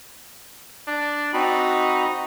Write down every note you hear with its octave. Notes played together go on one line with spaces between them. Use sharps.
D4
C4 D#4 F#4 B5